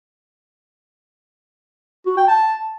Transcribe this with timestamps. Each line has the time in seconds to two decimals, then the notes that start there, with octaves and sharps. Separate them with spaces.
2.06 F#4
2.17 G5
2.28 A5